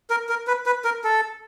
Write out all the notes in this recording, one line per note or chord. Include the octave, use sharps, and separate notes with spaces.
A#4
A#4
B4
B4
A#4
A4